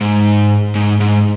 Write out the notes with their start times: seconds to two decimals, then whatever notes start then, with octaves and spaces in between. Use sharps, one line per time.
0.01 G#2
0.75 G#2
1.00 G#2